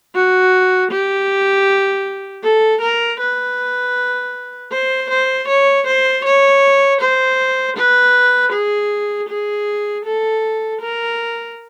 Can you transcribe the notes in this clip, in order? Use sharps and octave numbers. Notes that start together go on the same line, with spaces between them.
F#4
G4
A4
A#4
B4
C5
C5
C#5
C5
C#5
C5
B4
G#4
G#4
A4
A#4